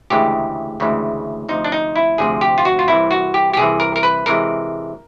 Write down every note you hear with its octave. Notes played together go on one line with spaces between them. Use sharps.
D2 C#3 E3 G#3 G4
D2 C#3 E3 G#3
D2 C3 F3 D#4
D4
D#4
E4
D2 C3 F3 G#4
G4
F4
F#4
F4
C2 C3 E3 E4
F#4
G4
G4
C2 C3 E3 G#4
A#4
A#4
B4
C3 E3 G#3 A#4